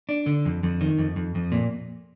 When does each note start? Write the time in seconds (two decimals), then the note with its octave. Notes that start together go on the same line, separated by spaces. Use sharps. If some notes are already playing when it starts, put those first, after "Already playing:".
0.09 D4
0.26 D3
0.45 F2
0.63 F2
0.81 D#3
0.99 F2
1.16 F2
1.35 F2
1.52 A#2